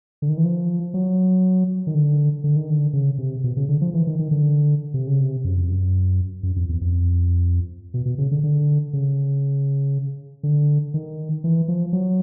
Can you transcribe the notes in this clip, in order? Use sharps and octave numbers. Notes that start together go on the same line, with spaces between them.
D3
D#3
E3
F3
F#3
D#3
D3
D3
D#3
D3
C#3
C3
B2
C#3
D3
F3
E3
D#3
D#3
D3
C3
C#3
C3
F#2
F2
F#2
F#2
F2
E2
F2
B2
B2
C#3
D3
D3
C#3
D3
D#3
E3
F3
F#3